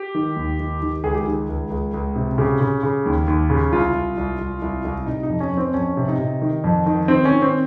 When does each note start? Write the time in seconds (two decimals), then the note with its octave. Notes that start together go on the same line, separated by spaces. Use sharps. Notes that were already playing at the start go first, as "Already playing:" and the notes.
Already playing: G4
0.15 D#3
0.36 D#2
0.60 D#3
0.82 D#3
1.03 C#2 G#4
1.14 G4
1.25 D#3 G#4
1.49 C#2
1.71 C#2
1.94 C#2
2.16 C3
2.38 C#3 G4
2.61 C#3
2.83 C#3
3.06 D#2
3.28 D#2
3.50 C#3
3.72 C2 F4
3.94 C2
4.18 C2
4.39 C2
4.62 C2
4.85 C2
5.06 C3 D#4
5.23 D#4
5.29 F2
5.40 C#4
5.52 F2
5.57 C4
5.74 F2 C#4
5.97 C3
6.08 D#4
6.18 C3
6.42 D#3
6.64 F2
6.86 D#3
7.08 D#3 C4
7.25 C#4
7.31 D#3
7.42 C4